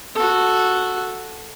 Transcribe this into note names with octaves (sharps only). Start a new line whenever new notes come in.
F#4 A4